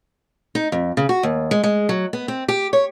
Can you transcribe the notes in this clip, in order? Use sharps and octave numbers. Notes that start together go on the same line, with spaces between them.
D#4
F2
C#3
F#4
D#2
G#3
G#3
F#3
B3
C4
G4
C#5